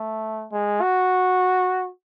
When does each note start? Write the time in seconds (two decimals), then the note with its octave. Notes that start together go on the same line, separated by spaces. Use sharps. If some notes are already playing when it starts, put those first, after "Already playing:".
Already playing: A3
0.52 G#3
0.81 F#4